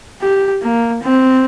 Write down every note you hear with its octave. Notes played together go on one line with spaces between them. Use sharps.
G4
A#3
C4